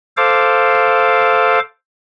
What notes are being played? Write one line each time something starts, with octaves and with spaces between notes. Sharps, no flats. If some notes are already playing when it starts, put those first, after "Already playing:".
A4 C5 F5 D6